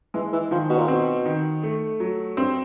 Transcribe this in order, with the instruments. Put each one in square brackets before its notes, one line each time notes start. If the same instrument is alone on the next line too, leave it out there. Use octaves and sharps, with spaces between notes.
[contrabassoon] E3 [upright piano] G#3
[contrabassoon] E3
[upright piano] D#3 [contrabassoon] F3
[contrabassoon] B2
A#2
[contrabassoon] B2 [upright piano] C4
[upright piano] D#3
A3
F#3
[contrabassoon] G2 [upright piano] C4